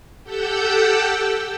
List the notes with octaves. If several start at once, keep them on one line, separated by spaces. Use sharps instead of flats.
G4 A4 F#5 G5 E6 G6